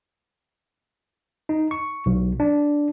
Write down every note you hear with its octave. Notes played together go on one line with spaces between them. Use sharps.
D#4
C#6
B1
D4